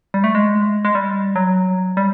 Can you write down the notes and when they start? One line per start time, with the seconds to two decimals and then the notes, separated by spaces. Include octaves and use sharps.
0.14 G3
0.24 A3
0.35 G#3
0.85 G#3
0.95 G3
1.36 F#3
1.97 G3